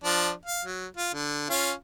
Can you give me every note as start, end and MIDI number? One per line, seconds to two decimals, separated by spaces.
0.04 0.31 53
0.04 0.31 62
0.46 0.63 77
0.65 0.87 54
0.97 1.10 65
1.13 1.50 50
1.50 1.72 61
1.50 1.72 65
1.50 1.72 77